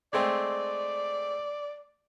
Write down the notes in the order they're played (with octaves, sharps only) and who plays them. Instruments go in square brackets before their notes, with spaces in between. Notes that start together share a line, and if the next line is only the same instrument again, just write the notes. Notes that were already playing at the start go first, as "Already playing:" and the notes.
[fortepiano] G#3 A3 C4 [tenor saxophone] D5